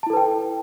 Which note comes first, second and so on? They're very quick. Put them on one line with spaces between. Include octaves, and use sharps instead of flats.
A5 E4 A4 B4 G5